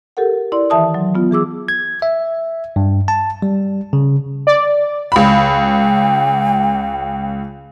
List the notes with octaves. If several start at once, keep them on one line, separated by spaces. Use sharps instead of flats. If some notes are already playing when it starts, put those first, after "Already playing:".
G4 A4 A#4 F#5
E4 D5 C6
D#3 E3 E5 A5 D#6
F#3
B3 F4
E3 G#4 D6 E6
G#6
E5
G2
A5
G3
C#3
D5
C#2 G5 B5